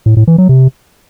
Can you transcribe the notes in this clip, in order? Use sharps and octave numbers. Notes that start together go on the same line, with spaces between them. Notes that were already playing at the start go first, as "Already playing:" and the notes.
A2
A2
E3
F#3
C3